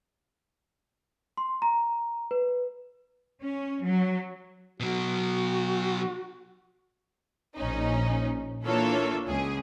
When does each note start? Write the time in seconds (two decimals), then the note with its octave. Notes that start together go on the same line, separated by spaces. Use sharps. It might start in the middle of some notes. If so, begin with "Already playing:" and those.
1.37 C6
1.62 A#5
2.31 B4
3.42 C#4
3.82 F#3
4.80 B2 F#3 F#4
7.55 A#1 C#4 D#4
8.65 E3 A#3 D4 F4 A4 C#5
9.28 C#2 G#4